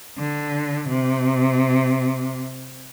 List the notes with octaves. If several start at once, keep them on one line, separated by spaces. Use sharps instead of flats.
D3
C3